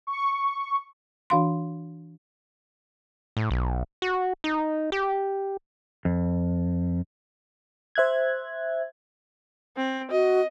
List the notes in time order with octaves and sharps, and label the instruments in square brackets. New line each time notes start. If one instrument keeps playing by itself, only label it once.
[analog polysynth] C#6
[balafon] E3 D4 F#4 F5 B5 C6
[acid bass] A2
B1
F#4
D#4
G4
[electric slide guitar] F2
[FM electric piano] C5 E5 F#6 G#6
[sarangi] C4
[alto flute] F#4 [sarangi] D#5